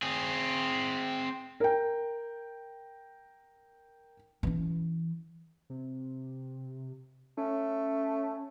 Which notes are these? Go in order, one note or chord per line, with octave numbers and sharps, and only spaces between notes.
C4 G#4
A#4 G5
E3 C#4
C3
A3 C#4